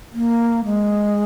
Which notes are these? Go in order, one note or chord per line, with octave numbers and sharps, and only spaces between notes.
A#3
G#3